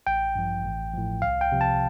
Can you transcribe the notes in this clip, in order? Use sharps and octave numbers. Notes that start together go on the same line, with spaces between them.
A1 G5
G2 F3
A1
A2 F3
C2 F5
G5
C3 F3
A5